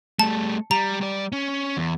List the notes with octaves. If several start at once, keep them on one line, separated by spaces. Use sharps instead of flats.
G3 A3 A5
G3 A#5
G3 D5
C#4
E2